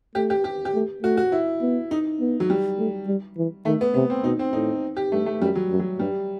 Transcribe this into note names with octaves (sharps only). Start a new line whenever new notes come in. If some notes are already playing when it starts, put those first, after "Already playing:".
A3 G4
G4
G4
G4
A3
A3 F#4
F#4
E4
B3
D#4
B3
F#3
G3
A3
G3
E3
D#3 A3
B3
C3 B3
C4
B2 D#4
C4
A2 D#4
G4
G2 A3
A3
F#2 G3
F#3
F#2
F#3
G2 G3